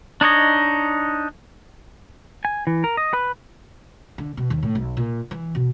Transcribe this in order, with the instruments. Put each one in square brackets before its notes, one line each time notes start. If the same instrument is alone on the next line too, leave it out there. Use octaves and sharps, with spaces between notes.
[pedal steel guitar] D4 D#4 C#5 D#5
[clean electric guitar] G#5
E3
A#4
D#5
B4
[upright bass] D3
B2
D#2
A2
B1
A#2
E3
B2